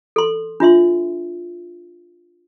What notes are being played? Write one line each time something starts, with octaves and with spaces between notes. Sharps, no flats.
A4 C6
D4 F4 E5 C6